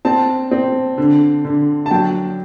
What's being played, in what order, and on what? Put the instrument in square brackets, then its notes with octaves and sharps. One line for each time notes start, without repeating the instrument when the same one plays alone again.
[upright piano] C4 A5
C4
D3
D3
A5
F#3 G5